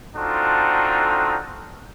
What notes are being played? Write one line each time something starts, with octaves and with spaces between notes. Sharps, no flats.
C4 D4 D#4 F4 F#4 A4